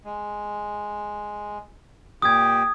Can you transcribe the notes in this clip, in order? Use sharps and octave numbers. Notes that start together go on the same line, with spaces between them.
G#3
A#2 G4 D#6 G#6